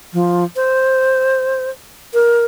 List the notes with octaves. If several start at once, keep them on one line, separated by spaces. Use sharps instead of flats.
F3
C5
A#4